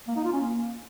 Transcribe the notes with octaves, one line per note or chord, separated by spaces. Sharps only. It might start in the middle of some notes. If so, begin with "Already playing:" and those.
A#3
D#4
F4
C#4
A#3